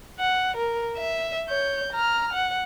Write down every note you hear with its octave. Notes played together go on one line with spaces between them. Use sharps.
F#5
A#4
E5
C#5 G6
A#5 F6
F#5